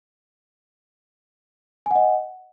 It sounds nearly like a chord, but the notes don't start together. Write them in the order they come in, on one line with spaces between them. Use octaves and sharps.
G#5 F#5 D#5